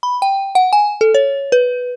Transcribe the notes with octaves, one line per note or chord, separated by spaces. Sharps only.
B5
G5
F#5
G#5
A4
C#5
B4